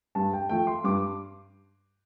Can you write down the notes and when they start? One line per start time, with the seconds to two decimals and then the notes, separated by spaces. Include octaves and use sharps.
0.15 G2 A5
0.33 G5
0.49 F3 A3 G5
0.67 C6
0.84 G2 D6